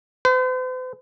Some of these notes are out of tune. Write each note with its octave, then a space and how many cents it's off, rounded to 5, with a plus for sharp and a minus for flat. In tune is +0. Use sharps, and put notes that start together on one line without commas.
C5 -45